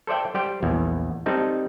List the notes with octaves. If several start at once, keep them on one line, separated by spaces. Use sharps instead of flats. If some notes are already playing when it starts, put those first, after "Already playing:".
A4 C5 D5 E5 G5
G3 G4 C5 G5
A#1 E2
G3 C4 D#4 A4